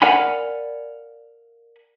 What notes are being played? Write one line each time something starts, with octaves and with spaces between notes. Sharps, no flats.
A#4 D5 F5 F#5 G#5 B5